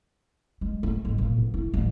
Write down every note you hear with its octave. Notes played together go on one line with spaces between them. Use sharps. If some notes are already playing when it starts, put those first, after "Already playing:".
G#3
A3
G#1
A#2
B2
E4
A1